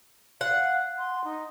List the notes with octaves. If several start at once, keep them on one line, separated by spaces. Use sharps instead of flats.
F5 F#5
C6
D#4